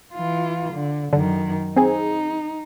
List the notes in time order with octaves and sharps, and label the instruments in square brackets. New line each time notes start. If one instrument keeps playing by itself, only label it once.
[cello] E3 F4
D3
[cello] F#2 D#3 [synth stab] D3
[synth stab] C4 G#4 [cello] D#4